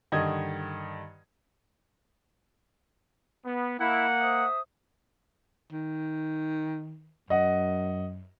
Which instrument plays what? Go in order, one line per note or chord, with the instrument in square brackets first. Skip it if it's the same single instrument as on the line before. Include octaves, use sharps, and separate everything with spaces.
[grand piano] G2 D3 D#3 D#5 G#6
[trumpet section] B3
[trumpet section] A#3 F#5 [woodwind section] E4
[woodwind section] C5 E5 D#6
[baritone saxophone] D#3
[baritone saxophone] F#2 [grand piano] D#5 F#5